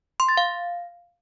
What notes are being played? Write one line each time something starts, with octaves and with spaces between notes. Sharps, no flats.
C6
A6
F5